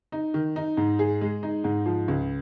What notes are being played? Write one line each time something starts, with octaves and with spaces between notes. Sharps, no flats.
D#4
D#3
D#4
G#2
G#4
G#3
D#4
G#2
F3
C#2